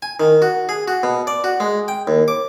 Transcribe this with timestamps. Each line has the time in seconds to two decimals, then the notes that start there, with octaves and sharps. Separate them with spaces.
0.02 G#5
0.20 D#3
0.42 F#4
0.69 G#4
0.88 F#4
1.03 B2
1.27 D5
1.44 F#4
1.60 G#3
1.88 G5
2.07 D#2
2.28 D6